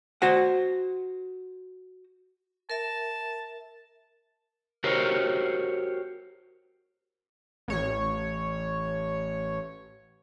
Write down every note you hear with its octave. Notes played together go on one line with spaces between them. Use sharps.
F#4 C5 F#5
A#4 E5 A5
F#4 G4 A#4 C5 C#5
A1 C#5